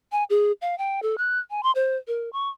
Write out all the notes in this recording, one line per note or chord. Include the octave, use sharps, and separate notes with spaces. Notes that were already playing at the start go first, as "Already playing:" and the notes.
G#5
G#4
F5
G5
A4
F#6
G#5
C6
C5
A#4
C#6